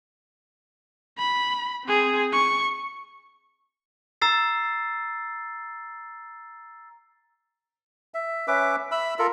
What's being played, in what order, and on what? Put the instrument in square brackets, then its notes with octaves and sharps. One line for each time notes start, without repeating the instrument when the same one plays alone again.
[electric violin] B5
C4 G#4
C#6
[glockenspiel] A#5 E6 A6 C7
[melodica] E5
C#4 B4 E5 D6
E5 B5 E6
F4 A4 A#4